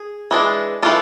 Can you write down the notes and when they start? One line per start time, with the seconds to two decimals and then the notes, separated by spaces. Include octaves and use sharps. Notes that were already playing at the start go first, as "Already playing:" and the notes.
Already playing: G#4
0.31 E3 G#3 D4
0.83 E3 A3 D4 F4